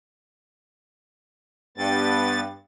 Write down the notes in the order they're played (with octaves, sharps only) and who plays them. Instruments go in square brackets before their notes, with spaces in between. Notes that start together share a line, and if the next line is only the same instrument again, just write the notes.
[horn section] G2 [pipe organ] B3 A6